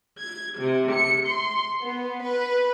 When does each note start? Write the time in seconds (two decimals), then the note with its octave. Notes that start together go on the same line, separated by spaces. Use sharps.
0.20 G#6
0.60 C3
0.93 C#7
1.27 C6
1.82 B3
2.23 B4